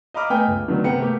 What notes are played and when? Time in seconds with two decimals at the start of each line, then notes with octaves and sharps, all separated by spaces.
0.14 D#5 F5 A#5 B5 D6 F6
0.30 A3 B3 D#5 G5 G#5
0.47 C#2
0.68 D3 D#3 F#3 A3 B3
0.84 C3 B3 A#4 F#5 G5 C#7
1.00 A3 A#3 G4